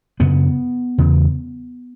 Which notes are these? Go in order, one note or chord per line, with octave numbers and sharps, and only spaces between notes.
F#2 C#3 B3
E2 C#3